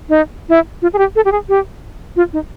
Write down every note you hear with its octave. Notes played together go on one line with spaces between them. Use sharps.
D#4
E4
F4
G#4
G4
A4
G4
G#4
G4
F4
D#4